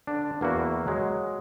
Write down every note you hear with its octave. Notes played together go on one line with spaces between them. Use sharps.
D3 D4
E2 A#3 E4 F#4
F#3 G#3